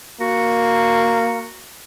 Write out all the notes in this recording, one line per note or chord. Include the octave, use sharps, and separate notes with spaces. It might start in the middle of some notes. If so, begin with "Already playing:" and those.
A#3 F#4